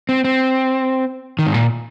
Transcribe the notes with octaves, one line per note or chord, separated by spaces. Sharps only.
C4
C4
D#3
G#2
A#2